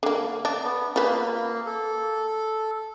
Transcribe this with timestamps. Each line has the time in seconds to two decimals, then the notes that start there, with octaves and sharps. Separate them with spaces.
0.03 D3 A#3
0.45 D4
0.64 B3
0.96 A#3 F4 B4
1.66 A4